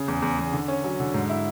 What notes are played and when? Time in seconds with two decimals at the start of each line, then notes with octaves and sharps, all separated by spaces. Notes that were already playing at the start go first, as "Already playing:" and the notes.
Already playing: C#3
0.08 E2
0.22 E2
0.39 E2
0.53 D3
0.68 C#4
0.84 F#3
1.00 D3
1.14 G#2
1.29 E4